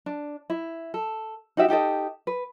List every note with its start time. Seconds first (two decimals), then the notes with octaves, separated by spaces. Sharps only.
0.06 D4
0.50 E4
0.94 A4
1.57 D#4 F#4 G4 E5
1.68 D#4 G4 A4 D#5
2.27 B4